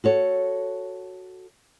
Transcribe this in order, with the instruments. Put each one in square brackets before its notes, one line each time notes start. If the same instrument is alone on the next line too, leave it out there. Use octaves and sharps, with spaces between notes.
[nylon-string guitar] F#4 A4 C#5